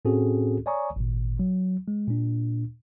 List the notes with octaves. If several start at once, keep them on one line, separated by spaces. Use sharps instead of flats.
A2 C4 C#4 F#4 G#4 A4
C#5 D5 G#5 A#5 C#6 D#6
G#1 A#2
F#3
G#3
A#2 D4